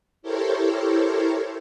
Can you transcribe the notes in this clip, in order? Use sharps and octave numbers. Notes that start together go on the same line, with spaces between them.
E4 G4 A4 A#4 C5 C#5